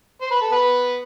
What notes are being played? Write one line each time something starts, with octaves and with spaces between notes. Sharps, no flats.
C5
B4
A4
B3 B4